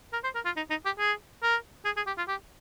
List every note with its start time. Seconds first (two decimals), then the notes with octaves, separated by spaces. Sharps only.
0.13 A#4
0.24 C5
0.35 A#4
0.45 F4
0.56 D#4
0.70 D#4
0.85 G4
0.99 G#4
1.43 A#4
1.85 G#4
1.96 G#4
2.07 G4
2.18 F4
2.28 G4